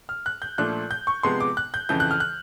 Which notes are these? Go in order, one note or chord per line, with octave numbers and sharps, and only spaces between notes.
F6
F#6
G6
A#2 F3 A3 D4 F#6
G6
C#6
C3 F3 G#3 B3 C6
D6
F#6
G6
F2 C#3 E3 G6
F#6
F6
F#6